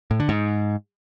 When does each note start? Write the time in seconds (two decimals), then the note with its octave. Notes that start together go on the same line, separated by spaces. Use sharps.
0.11 A2
0.20 D3
0.29 G#2